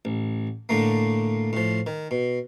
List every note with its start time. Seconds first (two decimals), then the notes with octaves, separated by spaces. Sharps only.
0.05 A1
0.69 A2 D3 A3 A#3
1.53 A2 F3
1.87 D#3
2.11 B2